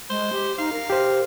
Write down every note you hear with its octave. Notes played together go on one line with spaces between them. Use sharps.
G#3 C5
G4
D#4 F5
A#4
G4 C5